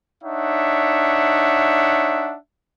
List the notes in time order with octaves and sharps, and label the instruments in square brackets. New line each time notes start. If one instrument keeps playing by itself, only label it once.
[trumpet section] D4 D#4 C#5 E5 F#5